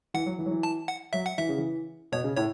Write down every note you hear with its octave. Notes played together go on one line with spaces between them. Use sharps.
E3 F#5
F#3
E3
F#3
E3
A5
F#5
F#3 E5
F#5
E3 E5
C#3
E3
B2 C#5
C#3
A2 C#5